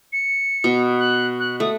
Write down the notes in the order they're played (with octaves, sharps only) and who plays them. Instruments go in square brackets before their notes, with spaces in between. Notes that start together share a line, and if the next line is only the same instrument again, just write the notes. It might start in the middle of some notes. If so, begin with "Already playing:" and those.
[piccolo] C#7
[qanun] B2
[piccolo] F#6
F#6
[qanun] A3 [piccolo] D#6